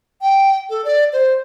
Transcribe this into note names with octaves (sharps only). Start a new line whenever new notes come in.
G5
A4
D5
C5